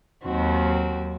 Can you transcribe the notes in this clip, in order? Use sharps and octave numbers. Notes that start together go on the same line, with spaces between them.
D#2 D#3 F#3 C4 F#4